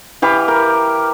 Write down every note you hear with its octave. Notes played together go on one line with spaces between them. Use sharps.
E3 G4 F5 B5
A#4